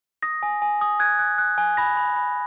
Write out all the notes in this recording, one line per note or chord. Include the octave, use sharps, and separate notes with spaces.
D#6 A#6
G#5
G#5
D#6
F#6 G#6
F#6
F#6
G#5
B5 A#6
B5
B5